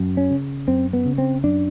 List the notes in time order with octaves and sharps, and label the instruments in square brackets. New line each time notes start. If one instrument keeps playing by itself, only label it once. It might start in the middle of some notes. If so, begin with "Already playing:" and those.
Already playing: [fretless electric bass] F#2
C#4
C#3
F#2 C4
B3
C#3
C4
F#2 D4